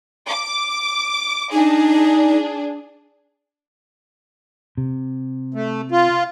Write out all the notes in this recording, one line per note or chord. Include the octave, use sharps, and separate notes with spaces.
D6
D4 D#4 G#4
C3
A3
F4